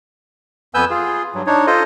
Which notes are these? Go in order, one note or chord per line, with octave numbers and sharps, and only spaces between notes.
F2 B3 B4 G#5 E6 G6
F4 G#4
G2 F#3
D4 D#4 C#5
F4 A4 C5 D#5